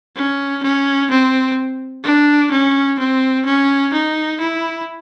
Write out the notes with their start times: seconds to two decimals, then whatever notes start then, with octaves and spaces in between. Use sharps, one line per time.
0.16 C#4
0.63 C#4
1.11 C4
2.04 D4
2.51 C#4
2.99 C4
3.46 C#4
3.93 D#4
4.40 E4